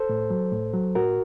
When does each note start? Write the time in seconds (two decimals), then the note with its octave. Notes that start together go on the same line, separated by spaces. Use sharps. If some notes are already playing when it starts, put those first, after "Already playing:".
Already playing: A4 C5
0.09 A2
0.30 F#3
0.52 A2
0.74 F#3
0.95 A2 F#4 A#4